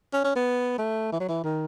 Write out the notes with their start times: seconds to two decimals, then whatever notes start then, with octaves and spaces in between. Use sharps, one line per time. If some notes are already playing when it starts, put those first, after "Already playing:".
0.13 C#4
0.24 C#4
0.36 B3
0.79 A3
1.12 E3
1.20 F#3
1.29 E3
1.44 D#3